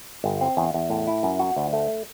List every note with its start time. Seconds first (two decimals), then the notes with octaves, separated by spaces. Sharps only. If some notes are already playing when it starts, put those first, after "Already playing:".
0.24 G1
0.41 C4
0.57 E2
0.74 E2
0.90 A2
1.07 E4
1.23 F#2
1.39 F#4
1.56 D2
1.73 A3